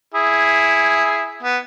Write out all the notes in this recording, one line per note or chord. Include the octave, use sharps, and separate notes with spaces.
E4 G#4
B3